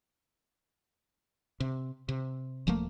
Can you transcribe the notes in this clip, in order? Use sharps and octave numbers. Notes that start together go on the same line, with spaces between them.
C3
C3
D#1 F3 A3 A#3